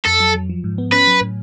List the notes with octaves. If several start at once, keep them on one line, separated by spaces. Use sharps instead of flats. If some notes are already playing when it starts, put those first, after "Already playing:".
F2 A4
F#3
F#3
F3
G#2
B3
C#4 B4
F#3
A2